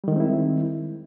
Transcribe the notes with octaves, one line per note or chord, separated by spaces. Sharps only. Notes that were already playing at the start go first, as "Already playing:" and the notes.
D#3 G3 G#3 C4 E4